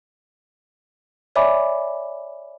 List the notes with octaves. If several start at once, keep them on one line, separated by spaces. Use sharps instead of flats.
C#5 D5 E5 G#5 B5 D6